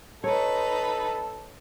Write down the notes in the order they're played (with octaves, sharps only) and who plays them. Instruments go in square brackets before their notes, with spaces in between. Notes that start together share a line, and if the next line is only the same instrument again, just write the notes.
[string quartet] D#4 B4 [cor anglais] A4 [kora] C#5